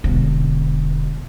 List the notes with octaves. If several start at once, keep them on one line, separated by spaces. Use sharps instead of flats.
E1 D3